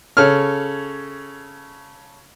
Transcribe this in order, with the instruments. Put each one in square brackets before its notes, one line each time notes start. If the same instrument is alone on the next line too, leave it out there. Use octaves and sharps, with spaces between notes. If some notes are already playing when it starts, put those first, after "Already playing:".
[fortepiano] C#3 A4 C#5 F6